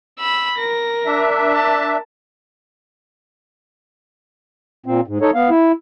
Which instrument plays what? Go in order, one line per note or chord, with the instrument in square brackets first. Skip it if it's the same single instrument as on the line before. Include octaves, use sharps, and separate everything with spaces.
[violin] B5 E6
[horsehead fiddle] A#4 [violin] A#6
[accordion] D4 E5
[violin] A5
[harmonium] A#2 C4
G#2
D#4 A4 C#5
B3 F5
E4